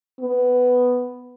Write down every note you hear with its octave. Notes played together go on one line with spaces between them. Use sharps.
B3